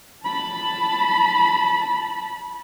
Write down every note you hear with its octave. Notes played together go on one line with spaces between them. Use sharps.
A5 B5